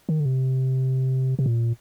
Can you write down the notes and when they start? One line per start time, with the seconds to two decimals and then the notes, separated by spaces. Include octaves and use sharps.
0.09 D#3
0.20 D3
0.25 C3
1.39 C3
1.46 A#2